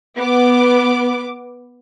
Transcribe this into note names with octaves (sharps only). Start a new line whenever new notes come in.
B3 D6